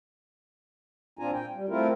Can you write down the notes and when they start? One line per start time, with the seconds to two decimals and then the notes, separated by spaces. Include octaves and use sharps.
1.19 A#2 C4 D4 F4 G#5 A#5
1.33 G5
1.54 G3
1.69 A3 C4 E4 F4 A#4